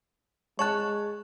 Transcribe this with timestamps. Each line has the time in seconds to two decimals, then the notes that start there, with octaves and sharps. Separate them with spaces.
0.59 G#3 C#5 A5 C#6 F#6